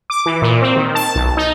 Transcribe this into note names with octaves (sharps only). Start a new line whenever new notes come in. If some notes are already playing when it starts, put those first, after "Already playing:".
D6
E3
A#2
C4
D#3
A5
B1
D#4